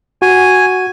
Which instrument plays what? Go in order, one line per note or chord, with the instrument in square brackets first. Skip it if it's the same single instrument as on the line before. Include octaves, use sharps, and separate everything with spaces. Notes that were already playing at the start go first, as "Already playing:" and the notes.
[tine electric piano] F#4 [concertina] G#5